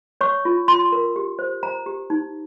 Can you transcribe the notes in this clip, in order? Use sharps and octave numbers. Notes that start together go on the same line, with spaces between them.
C#5 C#6
F4
F4 C6
A#4
G4
C5
C5 A#5
G4
D#4